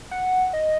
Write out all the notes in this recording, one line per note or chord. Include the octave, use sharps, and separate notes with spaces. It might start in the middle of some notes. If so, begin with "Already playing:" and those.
F#5
D#5